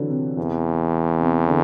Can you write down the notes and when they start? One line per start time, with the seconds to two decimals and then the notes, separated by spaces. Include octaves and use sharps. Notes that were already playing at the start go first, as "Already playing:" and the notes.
Already playing: D3 E3 F#3
0.09 C3
0.37 E2
1.19 C3
1.47 D3